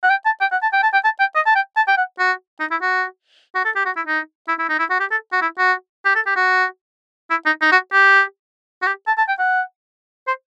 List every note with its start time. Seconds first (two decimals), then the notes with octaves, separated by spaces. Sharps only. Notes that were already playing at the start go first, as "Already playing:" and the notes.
0.03 F#5
0.10 G5
0.26 A5
0.41 G5
0.52 F#5
0.62 A5
0.73 G5
0.83 A5
0.93 G5
1.04 A5
1.20 G5
1.35 D#5
1.46 A5
1.56 G5
1.77 A5
1.88 G5
1.98 F#5
2.19 F#4
2.60 D#4
2.71 E4
2.82 F#4
3.55 F#4
3.65 A4
3.76 G4
3.86 F#4
3.96 E4
4.07 D#4
4.48 E4
4.59 E4
4.69 D#4
4.79 E4
4.90 F#4
5.00 G4
5.11 A4
5.32 F#4
5.42 E4
5.58 F#4
6.05 G4
6.15 A4
6.26 G4
6.36 F#4
7.30 E4
7.46 D#4
7.62 D#4
7.72 F#4
7.93 G4
8.82 F#4
8.87 G4
9.07 A5
9.18 A5
9.28 G5
9.39 F#5
10.27 C5